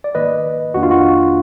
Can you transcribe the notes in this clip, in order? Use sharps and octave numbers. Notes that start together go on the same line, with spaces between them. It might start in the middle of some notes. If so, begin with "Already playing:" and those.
D5
G#2 D#3 A#3 B4 D#5
F2 D#3 A#3 D4 F#4
F4
F#4